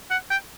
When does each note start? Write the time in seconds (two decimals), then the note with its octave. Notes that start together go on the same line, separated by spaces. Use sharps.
0.10 F#5
0.30 G5